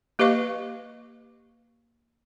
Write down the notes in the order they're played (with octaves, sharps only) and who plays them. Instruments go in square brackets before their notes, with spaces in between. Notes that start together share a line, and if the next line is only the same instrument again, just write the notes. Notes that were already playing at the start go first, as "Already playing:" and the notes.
[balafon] A#3 G4 B4 D#5 F5 C#6